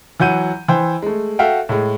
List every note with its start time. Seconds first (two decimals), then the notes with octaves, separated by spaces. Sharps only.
0.20 E3 F#3 F#5 G6 D#7
0.68 E3 C5 G5
1.02 G#3 A3
1.39 F#4 A4 E5 F5 G5
1.69 A2 G#3